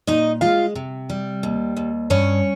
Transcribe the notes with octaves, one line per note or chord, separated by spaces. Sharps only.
A#2 D#4 D#5
G#3 F4 F5
C3
G3
D#2
D#2
G2 C#4 C#5